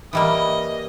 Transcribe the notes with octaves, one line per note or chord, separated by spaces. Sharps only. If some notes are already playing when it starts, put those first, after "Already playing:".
E3 G3 A#3 D#5